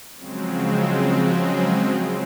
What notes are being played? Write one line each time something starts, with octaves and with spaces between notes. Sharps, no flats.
C#3 F3 F#3 G#3 C4